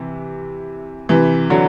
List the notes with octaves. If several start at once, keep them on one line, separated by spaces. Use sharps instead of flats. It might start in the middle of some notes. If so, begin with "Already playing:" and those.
Already playing: C3 E3
C3 E3
D3 F#3